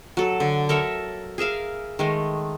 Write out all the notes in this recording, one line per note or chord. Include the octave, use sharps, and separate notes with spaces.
F#3 A4
D3
A4 A#4 C#5 E5
G#4 A#4 E5 F5
D#3 G#3 A3